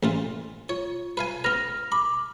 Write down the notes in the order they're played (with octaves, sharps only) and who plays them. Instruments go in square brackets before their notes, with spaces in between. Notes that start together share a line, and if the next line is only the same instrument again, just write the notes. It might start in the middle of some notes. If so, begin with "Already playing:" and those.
[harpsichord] A1 A#2 F4
[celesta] F4 [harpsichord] C#5
[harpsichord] B4 F5 G#5
[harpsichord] B3 B4 [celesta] F6 A#6 F7
[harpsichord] B5 [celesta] D6